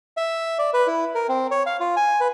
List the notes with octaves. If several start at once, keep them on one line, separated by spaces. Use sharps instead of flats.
E5
D5
B4
E4
A#4
C4
C#5
F5
F4
G#5
B4